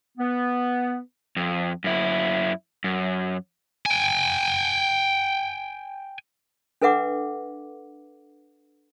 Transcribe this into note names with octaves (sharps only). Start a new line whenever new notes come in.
B3
F2
F#2 E4
F#2
G5 G#5
D4 A4 B4 E5 F#5 D6